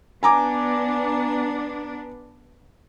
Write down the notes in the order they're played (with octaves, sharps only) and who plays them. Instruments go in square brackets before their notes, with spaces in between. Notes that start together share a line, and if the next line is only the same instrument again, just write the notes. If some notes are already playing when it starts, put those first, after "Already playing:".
[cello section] B3 D4 [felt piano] G#5 A#5 D6